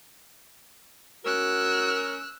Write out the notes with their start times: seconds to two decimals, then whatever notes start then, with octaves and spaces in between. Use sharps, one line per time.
1.25 C#4 F#4 A#4 E6 F#6